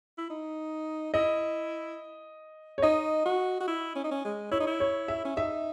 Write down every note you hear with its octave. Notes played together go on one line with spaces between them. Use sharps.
E4
D#4
E4 D#5
C#5
D#4 D#5
F#4
F#4
E4
C#4
D#4
C#4
G#3
E4 C#5
D#4
E4
C#5
E5
C#4
D#4 E5